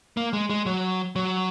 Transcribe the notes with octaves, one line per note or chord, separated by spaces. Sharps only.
A#3
G#3
G#3
F#3
F#3